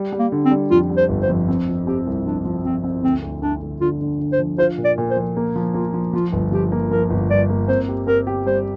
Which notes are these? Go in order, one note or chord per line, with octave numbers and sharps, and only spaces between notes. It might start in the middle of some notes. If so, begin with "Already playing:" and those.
Already playing: G3
G3
A#3
D3
C4
G3
F2 F4
G3
C5
G1
C5
F2
C4
F3
C4 G4
C2
F3 D4
F3
F3 C4
C4
D2 C4
D2
D2 D4
D2
D3 F4
D3
D3
C5
F3
F4 C5
A#2
D5
A#2
C5
F3
A#3
F3
A#3 F4
F3
F3 F4
G1
F3 G4
A#3
F3 A#4
G1
G2 D5
A#3
C4 C5
G4
C4 A#4
G4
G3 C5